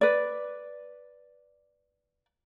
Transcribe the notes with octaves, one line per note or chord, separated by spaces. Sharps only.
B4 D5